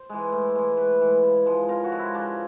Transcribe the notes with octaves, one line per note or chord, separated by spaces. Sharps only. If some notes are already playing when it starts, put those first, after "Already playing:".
Already playing: C5
E3 G#3
A2
E3 G#3
A2 B4
E3 G#3
C#3
F3 G#3
C#3 A#4
F#4
F3 G#3
E4
C#3 D4